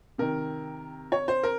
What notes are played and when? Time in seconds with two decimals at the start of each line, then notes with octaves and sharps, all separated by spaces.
0.18 C3 D#3 A#4
1.12 C#5
1.28 C5
1.43 A#4